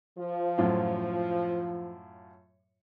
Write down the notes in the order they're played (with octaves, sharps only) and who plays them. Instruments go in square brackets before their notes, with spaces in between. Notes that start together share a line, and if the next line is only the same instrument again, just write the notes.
[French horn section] F3
[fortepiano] F#2 A2 F4